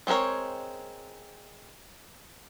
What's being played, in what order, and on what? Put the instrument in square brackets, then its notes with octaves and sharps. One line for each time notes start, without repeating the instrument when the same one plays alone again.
[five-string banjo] G#3 C4 F#4 A#4 C#5